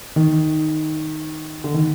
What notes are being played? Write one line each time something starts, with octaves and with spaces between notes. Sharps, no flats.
D#3
D3
D#3